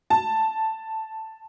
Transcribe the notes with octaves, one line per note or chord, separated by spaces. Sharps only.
A5